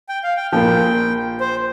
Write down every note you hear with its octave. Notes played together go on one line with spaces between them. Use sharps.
G5
F5
G5
A#1 A#2 F3 G5
C5